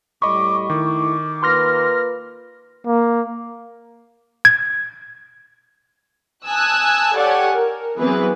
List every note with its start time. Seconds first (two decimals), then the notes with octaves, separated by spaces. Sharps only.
0.22 A2 G3 D#5 B5 C#6 D6
0.70 D#3 A3 E4 D6
1.43 A#3 F4 B4 C6 F6 A#6
2.86 A#3
4.45 G#6
6.48 G#5 A5 D#6 E6 F#6 G#6
7.17 G4 A4 C#5 D5 F#5 G#5
7.53 A#4
7.98 E3 F#3 B3 C4 G#4 B4